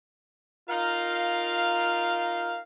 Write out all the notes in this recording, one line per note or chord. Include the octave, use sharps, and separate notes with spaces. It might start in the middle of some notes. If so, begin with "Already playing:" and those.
D#4 F4 A#4 F5